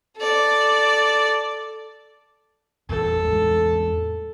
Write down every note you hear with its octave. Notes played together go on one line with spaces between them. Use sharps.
A4 D5
E2 A#2 G3 A4
E2 A2 G#3